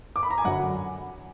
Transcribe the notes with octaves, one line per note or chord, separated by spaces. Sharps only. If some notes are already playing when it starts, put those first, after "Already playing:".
D6
B5
A#5
G#5
F#2 D3 F#3 F#5